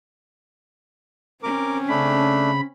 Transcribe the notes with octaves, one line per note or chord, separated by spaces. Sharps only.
C4 C#4 A#4 D6
C#3 A3 D4 B5